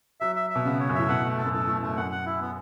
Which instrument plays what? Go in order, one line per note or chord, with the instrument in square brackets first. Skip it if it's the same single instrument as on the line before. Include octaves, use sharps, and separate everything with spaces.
[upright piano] F#3 [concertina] E5
[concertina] E5
E5
[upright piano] B2
[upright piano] C#3 [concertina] B3
[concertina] C#5
[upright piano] F#2
[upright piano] A2 [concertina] E5
[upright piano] B2 [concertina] F#5
[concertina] A3
A4
[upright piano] F#2
[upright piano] A2 [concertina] A4
[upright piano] A2 [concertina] A3
[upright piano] F#2 [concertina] A3
[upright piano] F#2 [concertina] F#5
[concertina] F#5
E4
B3